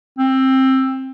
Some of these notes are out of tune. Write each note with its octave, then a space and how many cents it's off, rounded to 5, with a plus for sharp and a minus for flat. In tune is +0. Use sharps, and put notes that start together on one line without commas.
C4 +15